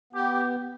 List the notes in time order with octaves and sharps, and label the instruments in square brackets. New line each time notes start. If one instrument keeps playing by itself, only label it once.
[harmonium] B3 [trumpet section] G4